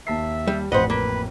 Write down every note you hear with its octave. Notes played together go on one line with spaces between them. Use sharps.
D#2 E5 A5 C7
G3
A1 F2 B4 C5 D#5 F#5
A#3 B4